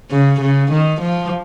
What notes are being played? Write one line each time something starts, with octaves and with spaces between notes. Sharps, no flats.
C#3
C#3
D#3
F3